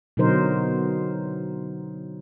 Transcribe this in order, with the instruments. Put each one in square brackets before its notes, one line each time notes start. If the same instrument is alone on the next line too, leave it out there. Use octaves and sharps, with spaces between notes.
[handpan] B2 D3 F#3 D#4 A#4 C5